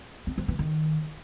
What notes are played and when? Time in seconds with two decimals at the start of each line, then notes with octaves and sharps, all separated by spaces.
0.27 C4
0.38 F3
0.48 E3
0.59 D#3